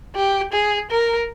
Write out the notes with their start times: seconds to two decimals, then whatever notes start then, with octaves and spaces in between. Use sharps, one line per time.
0.15 G4
0.52 G#4
0.91 A#4